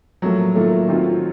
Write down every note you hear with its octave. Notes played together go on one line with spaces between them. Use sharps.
A2 F3 F#3 A#3 F4 A4
D#3 A3 A#3 F4
D#3 F#3 C4 F4